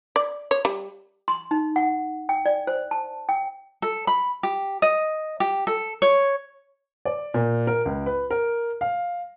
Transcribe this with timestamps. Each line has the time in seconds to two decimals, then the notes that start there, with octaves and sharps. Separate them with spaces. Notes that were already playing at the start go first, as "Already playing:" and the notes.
0.16 D5
0.51 C#5
0.65 G3
1.28 C6
1.51 D#4
1.76 F#5
2.29 G5
2.46 D5
2.67 C5
2.91 A5
3.29 G5
3.82 A4
4.07 B5
4.43 G4
4.82 D#5
5.40 G4
5.67 A4
6.02 C#5
7.05 D5
7.34 A#2
7.67 A#4
7.85 C#2
8.06 B4
8.31 A#4
8.81 F5